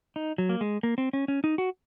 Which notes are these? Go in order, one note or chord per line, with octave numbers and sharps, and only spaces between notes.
D#4
F#3
A#3
G#3
A#3
C4
C#4
C#4
D#4
F#4